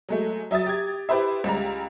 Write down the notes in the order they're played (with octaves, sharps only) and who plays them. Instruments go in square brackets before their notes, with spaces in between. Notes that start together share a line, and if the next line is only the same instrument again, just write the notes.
[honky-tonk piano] F#3 G#3 A3
F#3 E5 D#6 A6
G4 G#6
E4 G4 B4 C5 E5
C#2 G3 G#3 A#5